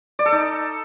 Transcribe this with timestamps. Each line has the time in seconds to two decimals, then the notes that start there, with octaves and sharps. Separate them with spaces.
0.19 D5
0.26 A4
0.32 D#4